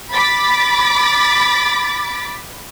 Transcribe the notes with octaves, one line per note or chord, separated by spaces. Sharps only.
B5 D6 A6 B6